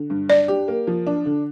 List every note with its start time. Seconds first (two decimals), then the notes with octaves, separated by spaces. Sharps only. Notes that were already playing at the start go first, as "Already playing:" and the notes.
Already playing: D3
0.10 G2
0.29 D4 D5
0.48 G4
0.68 A#3
0.87 F3
1.07 D4
1.25 D3